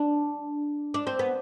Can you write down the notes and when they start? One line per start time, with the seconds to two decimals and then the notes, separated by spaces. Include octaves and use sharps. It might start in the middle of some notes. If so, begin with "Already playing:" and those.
Already playing: D4
0.94 D4
1.07 C4
1.19 B3